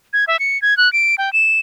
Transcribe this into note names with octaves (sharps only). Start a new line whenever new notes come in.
G#6
E5
C#7
G#6
F#6
D7
G5
E7